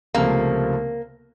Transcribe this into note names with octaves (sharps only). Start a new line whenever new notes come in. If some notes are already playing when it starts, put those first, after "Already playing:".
C#2 C3 F3 A3 A#3